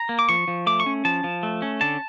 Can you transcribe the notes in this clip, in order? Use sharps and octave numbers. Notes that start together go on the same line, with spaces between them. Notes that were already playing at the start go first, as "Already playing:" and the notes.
Already playing: A#5
A#3
D6
F3 C#6
F3
A3 D6
C#6
C#4
F3 A5
F3
A3
C#4
D3 A5